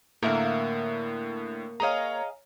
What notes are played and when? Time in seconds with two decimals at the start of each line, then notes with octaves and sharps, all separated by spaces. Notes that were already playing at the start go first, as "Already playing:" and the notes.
0.23 A2 D3 A#3 A#4 E5 F#5
1.80 G#4 C#5 D#5 F5 A#5